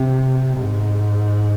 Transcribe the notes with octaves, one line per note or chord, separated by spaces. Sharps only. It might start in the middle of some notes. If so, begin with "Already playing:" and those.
Already playing: C3
G#2